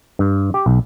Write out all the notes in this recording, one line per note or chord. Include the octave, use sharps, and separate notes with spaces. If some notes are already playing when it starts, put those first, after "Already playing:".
G2
G4
B1